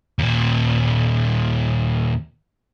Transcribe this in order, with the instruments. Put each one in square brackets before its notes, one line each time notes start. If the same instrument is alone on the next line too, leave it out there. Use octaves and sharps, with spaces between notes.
[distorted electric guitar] D#2 A#2